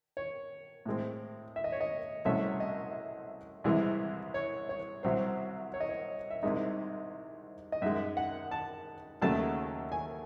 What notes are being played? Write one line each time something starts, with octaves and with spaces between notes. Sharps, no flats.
C#5
A2 G#3 C4
E5
D#5
C#5
D#5
C2 C3 F#3 A3 C#4 E5
D#5
C2 C3 E3 G#3
C#5
C#5
C2 C3 F#3 C4 C5
C#5
D#5
C#5
E5
C2 C3 D#3 G#3 D#4 D#5
D#5
F#2 D#3 G#3 E5
F#5
A5
D#2 C#3 F#3 A3 A5
G#5